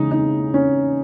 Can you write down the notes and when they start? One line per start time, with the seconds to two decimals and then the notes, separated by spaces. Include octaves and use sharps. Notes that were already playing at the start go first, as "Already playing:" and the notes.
Already playing: C#3 E3 G#3 D#4
0.11 D#4
0.54 C#4